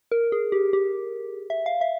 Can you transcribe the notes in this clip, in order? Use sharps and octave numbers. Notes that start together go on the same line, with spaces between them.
A#4
G#4
G4
G4
E5
F5
E5